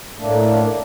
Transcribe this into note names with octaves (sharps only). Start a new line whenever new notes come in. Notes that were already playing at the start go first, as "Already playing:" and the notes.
A2 A3 A#3 D4